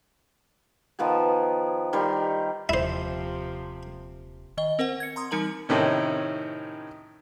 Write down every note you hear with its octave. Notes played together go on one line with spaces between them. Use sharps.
D#3 F3 B3 G#4
D#3 G3 B5 C6
D#1 C3 F3 E4 C5
D#3 D#5 G7
C4 A#4 C5 F#5
G#6 C#7
A#5 C6 D#6
E3 G3 D#4 A#4 A#5 F#7
A2 C3 D#3 C#4